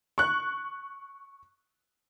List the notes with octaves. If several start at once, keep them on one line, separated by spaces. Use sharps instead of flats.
C#6 F#6